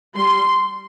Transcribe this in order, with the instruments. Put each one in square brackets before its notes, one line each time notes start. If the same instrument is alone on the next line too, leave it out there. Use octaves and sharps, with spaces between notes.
[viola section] G3 C6